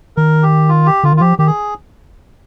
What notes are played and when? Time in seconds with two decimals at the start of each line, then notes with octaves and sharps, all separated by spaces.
0.17 D#3 A#4
0.43 G4
0.69 F4
0.86 G4
1.03 D3 F4
1.12 D#3
1.17 F4
1.21 F3 G4
1.39 D#3 G4
1.47 G#4